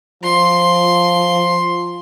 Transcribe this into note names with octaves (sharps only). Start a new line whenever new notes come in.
F3 C6